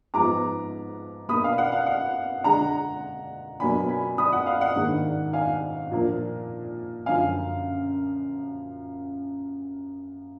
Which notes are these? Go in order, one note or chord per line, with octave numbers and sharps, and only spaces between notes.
G#2 F3 G#3 B3 A#5 D6
B2 A#3 D4 B5 D#6
F5
F#5
F5
F#5
D3 G#3 D4 F#5 A#5
B2 F#3 A#3 D4 G#5 B5
G#5 B5
B5 D#6
F#5
F5
F#5
G#2 D#3 A#3 D4
F5 G#5
A#2 F3 A#3 D4
F#2 D3 F3 F5 G#5